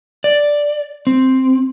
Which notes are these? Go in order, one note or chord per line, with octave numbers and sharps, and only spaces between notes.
D5
C4